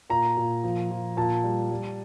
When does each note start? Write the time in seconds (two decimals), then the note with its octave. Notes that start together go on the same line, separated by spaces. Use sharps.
0.10 A#2 A#5
0.37 A#2
0.64 F3
0.91 F3
1.17 A#2 A5
1.44 G3
1.70 G3